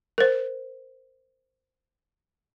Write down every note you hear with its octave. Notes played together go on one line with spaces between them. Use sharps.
A#4 C5